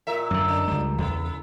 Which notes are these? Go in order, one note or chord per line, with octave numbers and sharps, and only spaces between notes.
A#2 A#4 E5
F#2 D3
D4
C#2 G3
E2 C#3